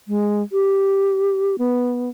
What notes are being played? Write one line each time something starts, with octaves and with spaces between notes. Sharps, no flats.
G#3
G4
B3